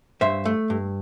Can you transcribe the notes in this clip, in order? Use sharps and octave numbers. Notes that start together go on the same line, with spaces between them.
G2 C5 E5
A3
G2